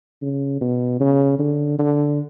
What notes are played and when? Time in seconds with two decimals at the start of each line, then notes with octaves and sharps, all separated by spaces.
0.22 C#3
0.61 B2
1.00 C#3
1.39 D3
1.79 D3